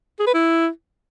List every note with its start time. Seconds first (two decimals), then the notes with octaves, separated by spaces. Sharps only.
0.19 G#4
0.27 B4
0.34 E4